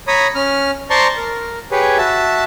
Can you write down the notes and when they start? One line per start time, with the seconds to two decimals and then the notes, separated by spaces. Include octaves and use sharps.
0.08 C#5 A#5 B5 D#6
0.35 C#4 F6
0.90 C5 D5 A5 A#5 C6 C#6
1.17 A#4
1.71 G4 G#4 B4 C#5
1.98 F#4 E5 A5